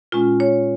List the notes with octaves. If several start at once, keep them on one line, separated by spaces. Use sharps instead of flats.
A#2 G#3 C#4 F4
C#5